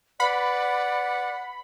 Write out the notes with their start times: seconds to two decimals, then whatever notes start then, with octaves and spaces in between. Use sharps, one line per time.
0.20 B4 D5 F#5 B5